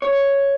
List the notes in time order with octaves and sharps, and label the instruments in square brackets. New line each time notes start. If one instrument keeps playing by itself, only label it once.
[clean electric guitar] C#5